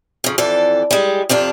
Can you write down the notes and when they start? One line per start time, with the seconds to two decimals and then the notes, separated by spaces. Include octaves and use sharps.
0.24 F2 C#3
0.38 F2 E3 A4 D5
0.91 G3 G#3
1.29 F2 C3 D4 F4